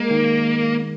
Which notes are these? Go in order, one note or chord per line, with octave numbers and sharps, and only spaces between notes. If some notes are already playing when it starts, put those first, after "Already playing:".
Already playing: G#3 A#3 A#4
D#3